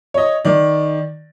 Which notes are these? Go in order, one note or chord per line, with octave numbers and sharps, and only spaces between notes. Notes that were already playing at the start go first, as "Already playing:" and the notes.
C#5 D#5
D#3 D5